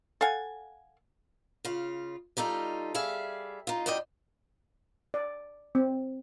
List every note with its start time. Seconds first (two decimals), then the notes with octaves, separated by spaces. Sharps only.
0.21 A4 F5 F#5 G#5
1.65 C#3 F4
2.37 G3 D#4 F4 A4
2.94 G3 G#4 E5 F5
3.67 D#4 F4
3.86 F#2 A2 D5 D#5 G5
5.14 D5
5.75 C4